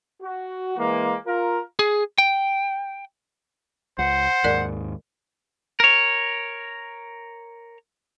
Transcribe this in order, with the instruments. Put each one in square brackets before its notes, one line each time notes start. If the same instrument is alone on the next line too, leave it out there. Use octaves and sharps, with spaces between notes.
[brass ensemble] F#4
E3 G#3 A#3
F4 A#4
[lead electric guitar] G#4
G5
[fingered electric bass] C#2 [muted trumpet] C5 [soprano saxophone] F#5
[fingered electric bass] D#2 G#2 [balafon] A#4 D5
[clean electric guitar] A#4 C#5